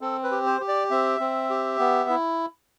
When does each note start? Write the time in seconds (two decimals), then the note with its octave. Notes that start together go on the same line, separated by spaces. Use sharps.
0.01 C4 A4
0.23 B4
0.31 G4
0.46 C5
0.61 G4
0.68 D5
0.90 C4 E5
1.20 C4
1.50 G4
1.79 B3
2.10 E4